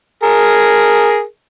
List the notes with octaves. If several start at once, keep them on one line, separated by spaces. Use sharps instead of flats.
G#4 A#4